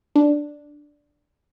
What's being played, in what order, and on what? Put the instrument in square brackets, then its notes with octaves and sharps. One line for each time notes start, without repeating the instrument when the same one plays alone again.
[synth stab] D4